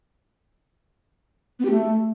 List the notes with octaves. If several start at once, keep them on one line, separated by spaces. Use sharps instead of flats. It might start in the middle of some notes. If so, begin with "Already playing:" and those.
B3
G4
A3